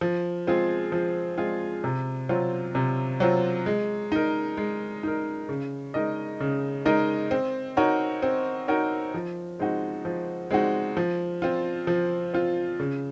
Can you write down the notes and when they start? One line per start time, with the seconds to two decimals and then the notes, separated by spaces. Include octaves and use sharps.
0.01 F3
0.47 G#3 C4 F4 G#4
0.92 F3
1.38 G#3 C4 F4 G#4
1.84 C3
2.29 F#3 C4 F4
2.75 C3
3.20 F#3 C4 F4
3.66 G#3
4.12 D#4 A#4
4.57 G#3
5.03 D#4 A#4
5.49 C#3
5.94 G#3 D#4 A#4 D#5
6.40 C#3
6.86 G#3 D#4 A#4 D#5
7.31 C4
7.77 D#4 F#4 A#4 C#5
8.23 C4
8.68 D#4 F#4 A#4 C#5
9.14 F3
9.59 G#3 C4 D#4 F#4
10.05 F3
10.51 G#3 C4 D#4 F#4
10.97 F3
11.42 C4 F4
11.87 F3
12.34 C4 F4
12.80 C#3